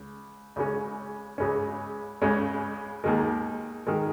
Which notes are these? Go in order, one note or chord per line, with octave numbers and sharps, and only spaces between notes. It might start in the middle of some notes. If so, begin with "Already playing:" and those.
Already playing: C#2
C#2 C#3 G#3 C#4
C#2 C#3 G#3 C#4
C#2 C#3 G#3 C#4
D#2 D#3 G#3
D#3 G#3